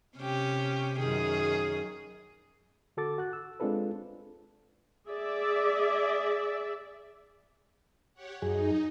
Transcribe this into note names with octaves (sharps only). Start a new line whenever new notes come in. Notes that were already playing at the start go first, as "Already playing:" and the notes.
C3 C#4 G4
F#2 D#3 G#4
D3 F#4 A4 D6 A6
F#4 F#6
E6
G#3 C4 D4 F4 A4 B4
G#4 D5 E5
G4 C#5 F#5
F#2 D#4 G#4